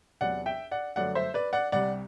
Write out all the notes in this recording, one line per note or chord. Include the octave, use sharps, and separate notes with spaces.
E2 C3 F#3 D5 F#5
E5 G5
D5 F#5
G1 F#2 F#3 A3 D5 F#5
C5 E5
B4 D5
D5 F#5
C2 C3 G3 D5 F#5